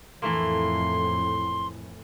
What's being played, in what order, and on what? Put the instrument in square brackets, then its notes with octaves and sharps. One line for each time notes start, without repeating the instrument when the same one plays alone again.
[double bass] F2 A2 [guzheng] E3 A3 A#3 [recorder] C6